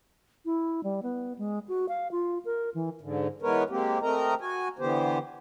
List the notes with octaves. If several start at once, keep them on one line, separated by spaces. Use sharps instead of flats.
E4
G3
B3
G#3
F#4
F5
F4
A#4
E3
G#2 D3
E3 G#3 B3 A#4 B4 C#5
G#3 A#3 C4 G4
A3 C4 A#4 D#5 A#5
F#4 G#5
D3 E3 B3 G4 C5